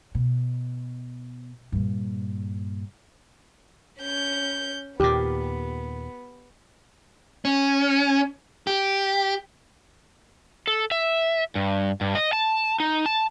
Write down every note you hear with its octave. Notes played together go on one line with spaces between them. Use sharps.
B2
G2 A#2
C#4 G6
D#2 A#2 B3 G4
C#4
G4
A4
E5
G2
G2
D#5
A5
D#4
A5